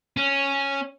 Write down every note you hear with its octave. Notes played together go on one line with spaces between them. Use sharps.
C#4